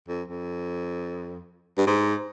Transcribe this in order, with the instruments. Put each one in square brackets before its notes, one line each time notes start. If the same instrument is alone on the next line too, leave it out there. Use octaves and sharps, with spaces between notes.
[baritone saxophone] F2
F2
G2
G#2